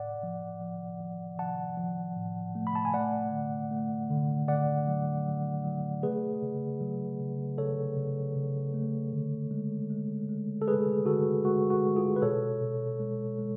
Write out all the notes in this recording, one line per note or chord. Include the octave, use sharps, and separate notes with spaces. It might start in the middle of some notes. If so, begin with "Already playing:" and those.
Already playing: A2 D5 F#5
F3
F3
F3
F3 F#5 A5
F3
A2
A3
B5
A5
G#5
A3 D5 F#5
D3
A3
D3
D3 D5 F#5
F#3
F#3
F#3
A3 G#4 B4
C#3
F#3
C#3
C#3 A4 C#5
C#3
C#3
A3
D3
G#3
G#3
G#3
A4
G#3 G#4 B4
D3 F#4 A4
G#3 F#4
F#4
G#3
F4 G#4
B4
B2 A4 C#5
B2
G#3
G#3